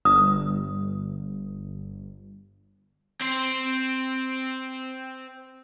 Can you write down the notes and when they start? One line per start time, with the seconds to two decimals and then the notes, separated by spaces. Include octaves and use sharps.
0.05 G1 D#6
3.21 C4 C5